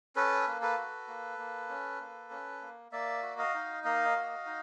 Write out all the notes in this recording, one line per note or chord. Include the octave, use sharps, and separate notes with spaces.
C#4 A4 B4
A#3
A4 B4
F#4
A#3
A#3
C#4
A#3
C#4
A#3
A#3 D5 E5
F#4
D#5 F5
D#4
A#3 D#5 F5
F#4
D#4